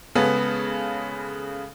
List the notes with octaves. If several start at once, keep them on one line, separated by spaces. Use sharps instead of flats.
C#3 G#3 B3 G#4 A4